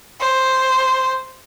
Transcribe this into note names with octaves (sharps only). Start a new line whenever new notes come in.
C5